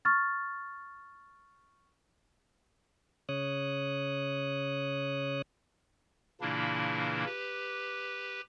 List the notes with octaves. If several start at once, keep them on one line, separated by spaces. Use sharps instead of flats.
C#6 F6 A6
C#3 C#5 D#6 F#6
A#2 C#3 E3 A#3 D4 E4
G4 B4